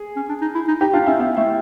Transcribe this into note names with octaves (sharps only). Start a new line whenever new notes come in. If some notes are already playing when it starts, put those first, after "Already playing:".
Already playing: G#4
C#4
D4
D#4
E4
D#4
D#4 G4
D4 F4
C#4 E4
B3 E4
A3 E4